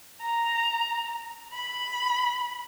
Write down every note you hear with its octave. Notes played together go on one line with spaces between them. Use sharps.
A#5
B5